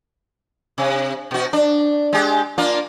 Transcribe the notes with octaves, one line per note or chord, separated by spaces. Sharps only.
C3
B2 F#4
D4
G#3 G4
A#3 D4 F4